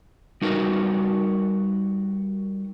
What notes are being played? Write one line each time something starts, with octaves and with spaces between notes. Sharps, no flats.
G3 D#4 F#4 A#4 B4